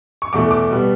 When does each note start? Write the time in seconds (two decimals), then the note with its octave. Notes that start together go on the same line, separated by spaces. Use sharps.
0.22 C#6
0.33 E2 B2 A3 D6
0.51 D6
0.70 B2 G3 B3